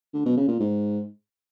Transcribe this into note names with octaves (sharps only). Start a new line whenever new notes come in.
D3
B2
C#3
A#2
G#2